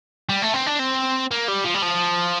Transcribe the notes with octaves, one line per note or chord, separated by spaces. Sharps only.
G3
A3
C4
D4
C4
A#3
G3
F3
G3
F3